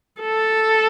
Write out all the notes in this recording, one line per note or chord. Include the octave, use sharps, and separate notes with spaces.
A4